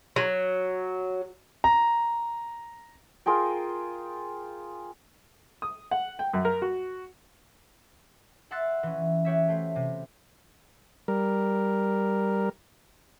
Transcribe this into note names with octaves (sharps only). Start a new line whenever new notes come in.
F#3
A#5
F4 G#4 A#4 G5
D#6
F#5
G5
F#2
A#4
F#4
E5 F#5 C6 E6 F#6 A6
E3 C#4
F#4 G4 C#5 E5
A3 C5
C3
G3 A#4